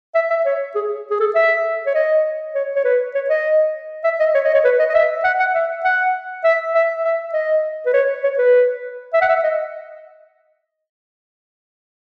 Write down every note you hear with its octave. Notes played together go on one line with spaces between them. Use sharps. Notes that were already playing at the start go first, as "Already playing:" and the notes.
E5
E5
C#5
G#4
G#4
A4
E5
C#5
D#5
C#5
C#5
B4
C#5
D#5
E5
D#5
C#5
D#5
C#5
B4
D#5
D#5
E5
F#5
F#5
E5
F#5
E5
E5
E5
D#5
B4
C#5
C#5
B4
E5
F#5
E5
D#5